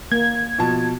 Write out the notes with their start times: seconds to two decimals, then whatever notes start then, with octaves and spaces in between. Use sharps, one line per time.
0.12 A#3 G#6
0.58 B2 F3 A5